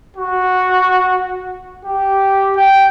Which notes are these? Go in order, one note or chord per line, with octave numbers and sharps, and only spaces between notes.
F#4
G4
G5